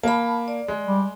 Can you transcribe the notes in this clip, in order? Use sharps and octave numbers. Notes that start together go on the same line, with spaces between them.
A#3 A5 B5
D5
G#3
G3